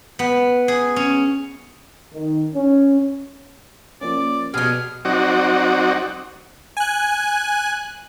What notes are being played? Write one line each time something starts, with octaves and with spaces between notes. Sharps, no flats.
B3
G#4
C#4
D#3
C#4
F3 A#3 C#4 D5
B2 F#3 B3 G4 G#4 F6
F#3 C4 D#4 F#4 D5
G#5 F#6